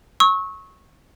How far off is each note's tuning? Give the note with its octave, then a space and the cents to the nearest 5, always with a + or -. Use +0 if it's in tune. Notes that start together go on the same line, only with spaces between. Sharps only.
C#6 -15 E6 -35